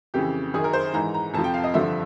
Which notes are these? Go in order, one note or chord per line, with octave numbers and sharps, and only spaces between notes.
F2 C#3 E3 G4
F#2 D#3 G#4
A#4
C5
G#2 E3 A#5
A#5
F2 C3 F3 A5
G5
F5
D#5
G2 D3 F3 E5